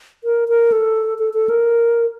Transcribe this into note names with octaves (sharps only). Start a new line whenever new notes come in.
A#4
A#4
A4
A4
A4
A#4